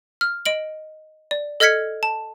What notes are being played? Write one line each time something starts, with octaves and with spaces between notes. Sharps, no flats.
F6
D#5 D7 F#7
D5
A4 D#5 F6 G#6 B6 C#7
A5